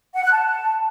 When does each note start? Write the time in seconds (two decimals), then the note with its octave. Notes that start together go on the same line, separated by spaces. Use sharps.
0.15 F#5
0.24 F#6
0.33 A5